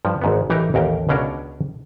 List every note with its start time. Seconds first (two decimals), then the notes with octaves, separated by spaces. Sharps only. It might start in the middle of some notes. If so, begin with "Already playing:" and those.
0.05 G2 F3
0.22 G#1 G#2 B3
0.50 A1 E3 D#4 G4 A#4
0.74 A1 D#2 A#4 G5
1.09 C#2 B2 C#4 D4 A#4